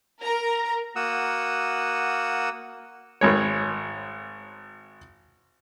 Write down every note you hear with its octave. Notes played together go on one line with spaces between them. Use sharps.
A#4 A#5
A#3 F#4 F#5 D#6 E6
G#1 G#3 C#5